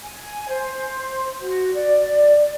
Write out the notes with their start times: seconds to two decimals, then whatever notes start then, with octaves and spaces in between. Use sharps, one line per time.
0.02 G#5
0.48 C5
1.39 F#4
1.73 D5